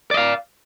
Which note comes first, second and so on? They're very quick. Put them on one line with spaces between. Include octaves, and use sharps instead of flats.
D5 D#5 F5